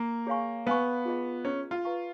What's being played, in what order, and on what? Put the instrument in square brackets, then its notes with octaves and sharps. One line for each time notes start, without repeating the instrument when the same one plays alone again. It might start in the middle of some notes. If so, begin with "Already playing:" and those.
Already playing: [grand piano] A#3
[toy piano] G#4 C#5 F5 G#5 C#6
[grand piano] B3 [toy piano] B4 F5 G#5 C#6
[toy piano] F4 G#4 D#5
[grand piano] C#4 [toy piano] G#4 D#5 A#5
[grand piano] F4
[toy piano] B4 F5 A#5 C#6